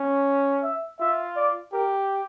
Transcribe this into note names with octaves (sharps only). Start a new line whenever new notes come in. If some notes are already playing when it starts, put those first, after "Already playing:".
Already playing: C#4
E5
F4 E5
D5
G4 A#4